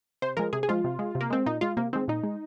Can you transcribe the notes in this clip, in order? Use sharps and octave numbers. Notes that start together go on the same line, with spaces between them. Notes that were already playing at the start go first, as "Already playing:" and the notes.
C3 C5
F3 G#3 A#4
C3 G#4
G#4
F3 G#3 F4
C3
G#3
C3
A#3
G#3 C4
A#2 D#4
G#3 F4
C3 A#3
D#3 G#3 C4
A#2 D#4
G#3